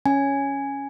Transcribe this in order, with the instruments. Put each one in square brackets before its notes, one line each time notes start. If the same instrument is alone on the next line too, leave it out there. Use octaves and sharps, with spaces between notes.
[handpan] C#4 [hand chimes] G#5